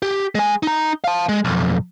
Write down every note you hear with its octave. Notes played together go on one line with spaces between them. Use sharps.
G4
G#3 G#5
D#4 A#5
F5 A5
G#3
B1 F2